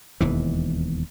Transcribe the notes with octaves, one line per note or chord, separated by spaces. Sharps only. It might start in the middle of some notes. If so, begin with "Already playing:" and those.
E1 D#2 E3